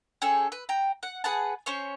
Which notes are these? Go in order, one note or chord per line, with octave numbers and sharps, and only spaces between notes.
C#4 G#4 A4 G5
B4
G5 A#5
F#5
G#4 B4 F#5 A5
C#4 C5 C#5